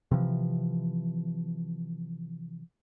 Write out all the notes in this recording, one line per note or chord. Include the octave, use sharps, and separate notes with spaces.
C3 E3 F3